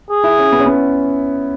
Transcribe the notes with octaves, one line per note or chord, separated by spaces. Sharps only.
G#4
E4
C#4
B3
C#4
B3